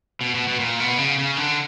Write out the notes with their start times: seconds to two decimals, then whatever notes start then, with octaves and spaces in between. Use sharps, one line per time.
0.21 B2
0.35 B2
0.48 B2
0.60 A#2
0.80 B2
0.98 C#3
1.18 C#3
1.37 D3